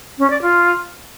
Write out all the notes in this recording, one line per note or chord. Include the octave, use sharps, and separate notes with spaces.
C#4
D5
F4